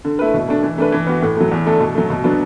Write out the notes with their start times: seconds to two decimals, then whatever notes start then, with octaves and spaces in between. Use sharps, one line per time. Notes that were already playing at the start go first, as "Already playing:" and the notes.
0.05 D3
0.19 A3 E4 B4
0.34 B2
0.48 A3 D4
0.63 E3
0.78 A3 D4 B4
0.92 E3
1.07 B3 F#4
1.22 A2
1.37 F#3 A3
1.51 E2
1.66 D3 A3 D4 A4
1.80 B2
1.95 F#3 A3
2.10 B2
2.24 F#3 B3 D4